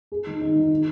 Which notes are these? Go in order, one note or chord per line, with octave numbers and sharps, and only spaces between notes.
G#4
D#3
D#4
D#3
D#3